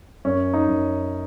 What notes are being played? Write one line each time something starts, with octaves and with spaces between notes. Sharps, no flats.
F#2 C#4
D#4
F#2